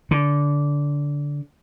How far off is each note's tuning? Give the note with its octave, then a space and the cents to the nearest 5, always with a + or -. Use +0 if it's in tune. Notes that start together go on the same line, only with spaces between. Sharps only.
D3 -20